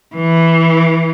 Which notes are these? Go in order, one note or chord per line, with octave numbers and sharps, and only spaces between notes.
E3